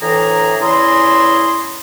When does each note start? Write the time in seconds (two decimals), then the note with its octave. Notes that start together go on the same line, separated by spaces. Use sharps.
0.01 D2 A2 E3 G#4 A#5
0.60 E2 C#4 E4 G#4 A#5 C6